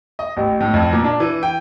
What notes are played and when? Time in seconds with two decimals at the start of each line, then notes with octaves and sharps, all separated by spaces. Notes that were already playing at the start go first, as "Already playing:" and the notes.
0.19 D#5
0.37 A1
0.60 A2
0.74 F2
0.93 A#2
1.04 D4
1.20 E3
1.43 G5